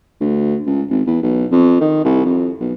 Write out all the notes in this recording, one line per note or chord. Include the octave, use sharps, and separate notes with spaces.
D2
C#2
G#1
E2
B1
F2
D#3
C2
F2
B1